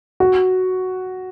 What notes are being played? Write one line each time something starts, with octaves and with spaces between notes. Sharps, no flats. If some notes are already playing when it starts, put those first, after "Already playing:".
F#4